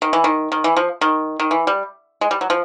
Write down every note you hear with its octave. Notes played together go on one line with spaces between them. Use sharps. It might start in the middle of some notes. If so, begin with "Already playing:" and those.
D#3
E3
D#3
D#3
E3
F3
D#3
D#3
E3
G3
G#3
G3
F#3
F3